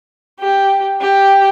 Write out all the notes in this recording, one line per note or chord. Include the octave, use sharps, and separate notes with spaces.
G4
G4